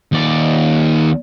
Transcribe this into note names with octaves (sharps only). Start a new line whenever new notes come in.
D#2 D5